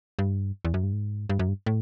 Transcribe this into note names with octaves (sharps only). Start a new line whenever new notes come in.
G2
E2
F#2
G2
G#2
G2
F#2
G2
A2